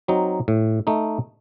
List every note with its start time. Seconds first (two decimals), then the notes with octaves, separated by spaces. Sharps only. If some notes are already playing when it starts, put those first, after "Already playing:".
0.08 F#3 C4 D#4
0.48 A2
0.87 A3 D#4